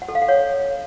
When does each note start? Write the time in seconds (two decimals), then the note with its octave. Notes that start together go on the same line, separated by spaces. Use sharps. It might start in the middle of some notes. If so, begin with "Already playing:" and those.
0.02 F#5
0.08 A4
0.15 F5
0.22 F#5
0.29 C#5